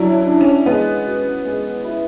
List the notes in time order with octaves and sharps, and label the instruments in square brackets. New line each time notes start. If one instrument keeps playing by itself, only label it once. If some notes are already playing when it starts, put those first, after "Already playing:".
Already playing: [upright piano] F#3 [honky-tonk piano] C#4 D4 E4
[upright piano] D4
[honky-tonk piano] C#4
[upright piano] G#3 [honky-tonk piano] B3
[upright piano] F#4
G#3
E4